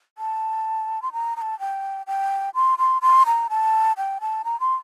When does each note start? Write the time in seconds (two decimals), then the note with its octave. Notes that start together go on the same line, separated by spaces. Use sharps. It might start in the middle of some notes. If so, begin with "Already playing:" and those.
0.18 A5
1.02 C6
1.13 A#5
1.37 A#5
1.42 A5
1.60 G5
2.07 G5
2.55 C6
2.78 C6
3.02 C6
3.26 A#5
3.50 A5
3.97 G5
4.21 A5
4.45 A#5
4.60 C6